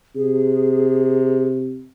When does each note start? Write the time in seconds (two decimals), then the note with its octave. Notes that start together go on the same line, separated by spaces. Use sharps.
0.16 C3 G#4